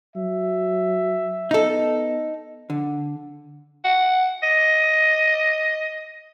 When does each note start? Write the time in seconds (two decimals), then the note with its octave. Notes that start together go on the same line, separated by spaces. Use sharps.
0.16 F#3 E5
1.51 B3 D#4 A4
2.70 D3
3.84 F#5
4.43 D#5